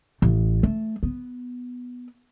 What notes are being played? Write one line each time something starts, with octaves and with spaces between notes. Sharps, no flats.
A1
A3
B3